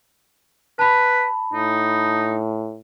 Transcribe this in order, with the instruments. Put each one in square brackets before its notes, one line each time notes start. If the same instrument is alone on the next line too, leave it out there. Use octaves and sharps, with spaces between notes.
[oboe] B4 [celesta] A5 B5
[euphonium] A2 [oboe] D#4